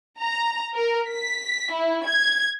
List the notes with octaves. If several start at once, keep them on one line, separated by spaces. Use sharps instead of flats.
A#5
A#4
B6
E4
G#6